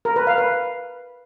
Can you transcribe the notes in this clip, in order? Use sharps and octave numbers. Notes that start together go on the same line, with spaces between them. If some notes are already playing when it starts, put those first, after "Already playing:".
A#4
B4
F5
B4